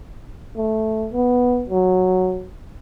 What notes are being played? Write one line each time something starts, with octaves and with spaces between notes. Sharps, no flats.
A3
B3
F#3